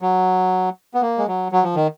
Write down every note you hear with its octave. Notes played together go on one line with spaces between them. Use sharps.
F#3
B3
A#3
G#3
F#3
F#3
F3
D#3